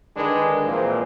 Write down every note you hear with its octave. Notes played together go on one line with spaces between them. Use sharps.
D3 D#3 G#3 D4 B4
A#2 E3 F3 G#3 A#3 C4